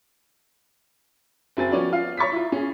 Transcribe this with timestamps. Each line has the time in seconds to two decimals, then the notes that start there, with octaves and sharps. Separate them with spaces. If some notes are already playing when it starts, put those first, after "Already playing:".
1.57 F#1 F#3 C4 G#5 A6
1.72 F3 F#3 B3 C#4 C#5 D5
1.92 F4 F5
2.17 C#5 C#6 A6 B6
2.32 E4 F4
2.52 C#4 G#4